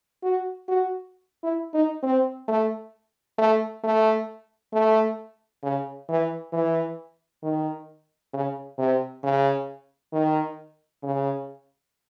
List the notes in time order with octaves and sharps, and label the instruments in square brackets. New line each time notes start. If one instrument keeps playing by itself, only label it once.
[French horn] F#4
F#4
E4
D#4
C4
A3
A3
A3
A3
C#3
E3
E3
D#3
C#3
C3
C#3
D#3
C#3